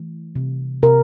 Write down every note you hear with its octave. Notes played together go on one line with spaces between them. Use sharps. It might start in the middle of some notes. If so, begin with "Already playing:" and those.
Already playing: E3 A3
C3
C3 A#4